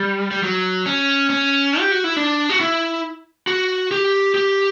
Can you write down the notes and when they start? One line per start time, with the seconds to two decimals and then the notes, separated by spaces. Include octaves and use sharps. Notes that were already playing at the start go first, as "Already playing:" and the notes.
Already playing: G3
0.31 G3
0.43 F#3
0.86 C#4
1.30 C#4
1.80 G4
1.92 F#4
2.04 E4
2.16 D4
2.50 F#4
2.60 E4
3.47 F#4
3.91 G4
4.35 G4